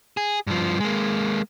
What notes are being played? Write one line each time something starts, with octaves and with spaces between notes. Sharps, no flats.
G#4
G2 F3
G#3 A#3